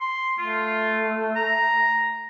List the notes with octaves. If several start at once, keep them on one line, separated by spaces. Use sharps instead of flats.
C6
A3 F4
A#5